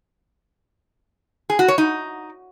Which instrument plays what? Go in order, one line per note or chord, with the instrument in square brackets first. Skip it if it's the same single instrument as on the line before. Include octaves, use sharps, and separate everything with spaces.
[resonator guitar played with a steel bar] G#4
F#4
C#5
D#4